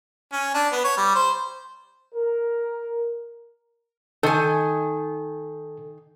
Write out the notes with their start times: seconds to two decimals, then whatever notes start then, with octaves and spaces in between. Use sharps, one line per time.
0.32 C#4
0.54 D4
0.72 B3
0.84 C#5
0.97 G3
1.15 C5
2.15 A#4
4.23 D#3 A4 G#5